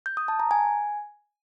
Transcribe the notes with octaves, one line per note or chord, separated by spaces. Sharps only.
G6
D#6
A5
A#5
G#5